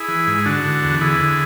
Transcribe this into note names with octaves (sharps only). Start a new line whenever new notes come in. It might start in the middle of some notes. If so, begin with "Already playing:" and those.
Already playing: E4 G#4
E3
G#2
G#4
D3 D4 F#4
D3
E2
D3 E4 G#4
D3